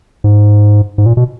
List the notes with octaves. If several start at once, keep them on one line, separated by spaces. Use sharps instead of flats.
G#2
G#2
A#2
B2